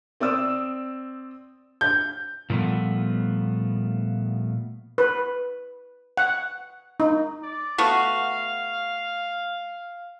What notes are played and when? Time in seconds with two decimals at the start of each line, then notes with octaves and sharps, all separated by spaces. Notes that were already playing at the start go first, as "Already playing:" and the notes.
0.20 C4 D5 D#6 E6
1.81 G6
2.50 A#2 F3 G3 A3 B3
4.98 B4
6.17 F#5
7.00 D#4
7.43 D5
7.78 A3 B3 F#4 F5